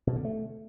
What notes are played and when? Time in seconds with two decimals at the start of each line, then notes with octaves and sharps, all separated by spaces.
0.07 B2
0.16 D3
0.25 A3